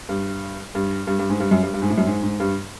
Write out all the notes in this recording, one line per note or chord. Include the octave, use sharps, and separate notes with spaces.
G2
G2
G2
G2
G#2
G2
F#2
G2
G2
G#2
A2
F#2
G#2
G#2
G2